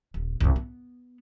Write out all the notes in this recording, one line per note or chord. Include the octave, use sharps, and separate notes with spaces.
D#1
C2 G2
B3